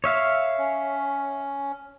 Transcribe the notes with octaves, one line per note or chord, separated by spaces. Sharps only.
C#5 E5 F5
C#4